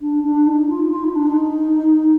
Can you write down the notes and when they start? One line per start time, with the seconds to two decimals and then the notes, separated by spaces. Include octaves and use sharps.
0.01 D4
0.23 D4
0.46 D#4
0.69 F4
0.92 F4
1.03 D#4
1.15 D4
1.27 D#4